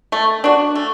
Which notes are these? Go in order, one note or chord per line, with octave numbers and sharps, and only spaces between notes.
A3
D4 F#4
A3